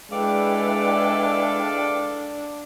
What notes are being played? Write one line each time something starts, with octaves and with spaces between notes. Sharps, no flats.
G#3 D4 E4 A4 B4 D5 F5 G5